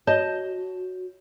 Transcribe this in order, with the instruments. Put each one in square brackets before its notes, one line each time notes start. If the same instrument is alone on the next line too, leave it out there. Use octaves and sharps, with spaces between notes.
[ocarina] F#4 [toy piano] C#5 [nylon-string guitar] D#5 A5